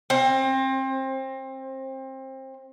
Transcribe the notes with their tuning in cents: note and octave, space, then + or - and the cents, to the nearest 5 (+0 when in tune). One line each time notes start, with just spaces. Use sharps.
C4 +25